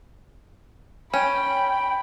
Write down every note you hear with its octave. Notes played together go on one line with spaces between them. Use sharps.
C#4 G5 B5